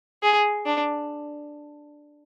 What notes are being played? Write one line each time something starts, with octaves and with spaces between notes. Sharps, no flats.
G#4
D4